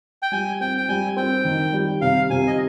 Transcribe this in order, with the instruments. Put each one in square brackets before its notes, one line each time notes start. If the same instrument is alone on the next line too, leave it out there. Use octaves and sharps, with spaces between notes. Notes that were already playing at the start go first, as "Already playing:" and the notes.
[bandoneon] G5
[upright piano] G3 [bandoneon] G#5
[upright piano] C4 [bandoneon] G5
[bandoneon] G5
[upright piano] G3 [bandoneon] G#5
[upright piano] C4 [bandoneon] G5
[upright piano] D#3
G3
[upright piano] C3 [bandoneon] F5
[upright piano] C3 [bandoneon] G#5
[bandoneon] D#5